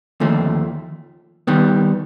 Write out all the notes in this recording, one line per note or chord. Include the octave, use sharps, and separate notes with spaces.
D#2 D3 F3 A3
D#3 G3 B3